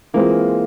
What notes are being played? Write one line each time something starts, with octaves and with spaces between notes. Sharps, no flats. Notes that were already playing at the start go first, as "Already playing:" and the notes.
E3 G#3 A#3 C4 F4